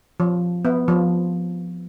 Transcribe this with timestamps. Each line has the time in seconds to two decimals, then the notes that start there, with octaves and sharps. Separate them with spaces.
0.20 F3
0.65 B3
0.88 F3